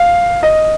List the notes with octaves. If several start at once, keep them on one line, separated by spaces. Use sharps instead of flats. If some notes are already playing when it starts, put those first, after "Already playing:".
Already playing: F5
D#5